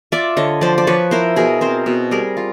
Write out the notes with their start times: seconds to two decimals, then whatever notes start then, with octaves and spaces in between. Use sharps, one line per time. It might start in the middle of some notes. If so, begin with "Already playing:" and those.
0.12 F4 D5 E5
0.37 D3 C#5 D#5
0.61 F3 C5 D5
0.78 D5
0.87 F3 B4 C#5
1.11 E4 A#4 C5
1.36 B2 G#4 A#4
1.61 C4 A#4 C5
1.86 B2
2.11 G3 G#4 A#4
2.37 F4